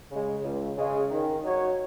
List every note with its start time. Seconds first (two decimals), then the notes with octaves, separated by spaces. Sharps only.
0.11 C#3 G#3
0.44 C#2
0.78 C#3 G#3
1.10 D#3
1.44 F#3 D#4 F#4 C#5